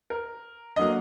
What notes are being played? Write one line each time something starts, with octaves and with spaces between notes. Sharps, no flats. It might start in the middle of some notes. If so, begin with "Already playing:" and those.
A#4
D3 F#3 A#3 D#5